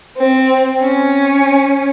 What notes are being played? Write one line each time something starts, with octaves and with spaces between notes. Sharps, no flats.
C4
C#4